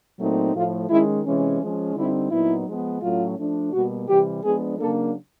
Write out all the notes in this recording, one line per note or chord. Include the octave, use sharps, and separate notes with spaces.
A#2 F#3 A3 C4 D#4
A2 F3 A3 F4
D#3 G#3 C#4 E4
C3 E3 G#3 C#4
F3 G#3 C#4
D3 G3 C4 D#4 E4
A#2 F#3 B3 D#4 E4
F3 G#3 B3
A2 F#3 A3 C#4 F4
F3 A3 D4
B2 G3 A#3 F#4
C3 E3 G3 G4
F3 G#3 B3 D4 G#4
C#3 F#3 A#3 D4 A4